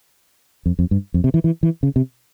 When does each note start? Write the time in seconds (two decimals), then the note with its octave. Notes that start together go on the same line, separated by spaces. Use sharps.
0.66 F2
0.79 F2
0.91 G2
1.14 F2
1.24 C3
1.34 E3
1.44 E3
1.63 E3
1.83 C#3
1.96 C3